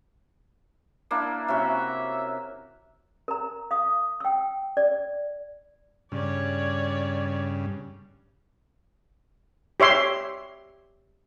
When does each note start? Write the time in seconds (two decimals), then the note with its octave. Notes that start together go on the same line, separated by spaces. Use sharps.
1.11 A#3 D4 E4
1.48 C3 C#4 F#4 E5
3.28 A#4 A#5
3.71 F5 D#6
4.20 G5 E6
4.77 D5
6.12 G2 C#3 C#5 D5
9.80 G4 C#5 E5 C6